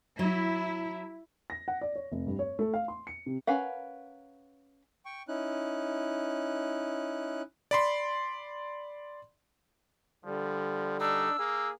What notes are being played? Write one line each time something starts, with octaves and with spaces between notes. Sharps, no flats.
F#3 E4
A#6
F#5
D5
C#5
F1
G2
C#5
A3
F5
C6
C#7
C3
C#4 A#4 B4 F5 F#5
G5 C#6
C#4 D#4 E4 F#6
D5 B5 C6
D3 F3 G3
D4 D#4 E6
A#3 G#4